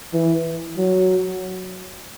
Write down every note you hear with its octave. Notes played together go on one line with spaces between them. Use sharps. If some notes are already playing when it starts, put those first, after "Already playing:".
E3
F#3